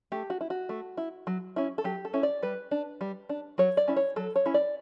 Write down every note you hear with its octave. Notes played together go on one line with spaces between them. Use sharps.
A3 G4
F#4
E4
F#4
A3
E4
F#3
C#4 E4
A4
F#3 G4
A4
C#4 E4
D5
G3 B4
D4
G3
D4
F#3 C#5
D5
C#4 E4
C#5
F#3 A4
C#5
C#4 E4
D5